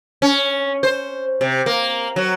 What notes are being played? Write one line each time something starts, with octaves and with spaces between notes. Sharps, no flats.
C#4
C5
C3
A#3
F#3